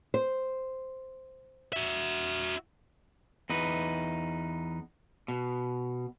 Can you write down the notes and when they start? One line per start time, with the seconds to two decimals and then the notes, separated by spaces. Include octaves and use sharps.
0.14 C5
1.73 F#4 E5
3.50 E2 D#4 B4
5.28 B2